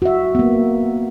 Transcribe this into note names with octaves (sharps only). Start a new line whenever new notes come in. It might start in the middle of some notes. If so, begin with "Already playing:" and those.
F#4 E5
A#3 B3